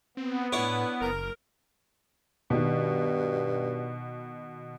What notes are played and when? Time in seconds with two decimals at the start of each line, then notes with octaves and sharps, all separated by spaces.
0.17 B3 C4
0.53 A2 D4 E4 B4 C#5
1.01 F#1 A#4
2.50 G2 B2 D#3